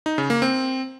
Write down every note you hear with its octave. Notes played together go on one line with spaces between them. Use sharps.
D#4
C#3
A#3
C4